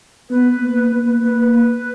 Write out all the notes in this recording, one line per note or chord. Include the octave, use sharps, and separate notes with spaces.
B3 B4
A#3
A#3
A#3 B4